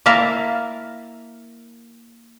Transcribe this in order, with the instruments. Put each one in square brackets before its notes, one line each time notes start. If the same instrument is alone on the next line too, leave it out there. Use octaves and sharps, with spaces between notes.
[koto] A#3 E4 A#4 E5 F5 A5